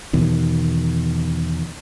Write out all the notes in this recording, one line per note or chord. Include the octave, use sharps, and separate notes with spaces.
E2 B2 D#3